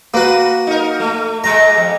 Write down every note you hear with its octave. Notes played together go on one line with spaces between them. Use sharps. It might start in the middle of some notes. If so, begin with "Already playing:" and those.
A#3 F#4 B4
D#4 A#4
A3
A#2 G#3 A#5
F2